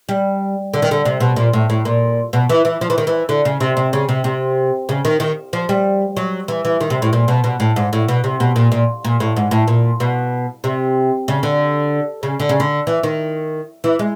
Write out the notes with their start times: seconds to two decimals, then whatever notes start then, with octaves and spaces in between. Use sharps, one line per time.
0.09 G3
0.74 D3
0.82 D#3
0.91 D3
1.05 C3
1.20 B2
1.36 A#2
1.53 A2
1.70 A2
1.85 A#2
2.33 B2
2.49 E3
2.65 E3
2.81 F3
2.90 E3
2.98 D#3
3.07 E3
3.29 D3
3.45 C#3
3.60 C3
3.77 C3
3.93 C#3
4.09 C3
4.24 C3
4.89 C#3
5.05 D#3
5.20 D#3
5.53 F3
5.69 G3
6.17 F#3
6.48 E3
6.65 E3
6.80 D#3
6.90 C3
7.02 A2
7.13 A#2
7.28 B2
7.44 B2
7.60 A2
7.76 G#2
7.93 A2
8.08 B2
8.24 C3
8.40 B2
8.56 A#2
8.72 A#2
9.04 A#2
9.20 A2
9.36 G#2
9.51 A2
9.68 A#2
10.00 B2
10.64 C3
11.28 C#3
11.43 D3
12.23 C#3
12.40 D3
12.49 C#3
12.60 D3
12.87 E3
13.03 D#3
13.84 E3
13.99 G#3